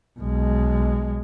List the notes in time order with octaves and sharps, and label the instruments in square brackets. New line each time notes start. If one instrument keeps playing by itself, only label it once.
[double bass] B1 G#3